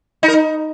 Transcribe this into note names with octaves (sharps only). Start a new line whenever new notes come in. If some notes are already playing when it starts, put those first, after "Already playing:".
D#4
A#4
D#4